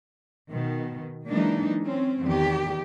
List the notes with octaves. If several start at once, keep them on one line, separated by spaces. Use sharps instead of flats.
B2 D#3
E3 F#3 G#3 A#3 D4 D#4
C4 C#4
E2 D#3 G4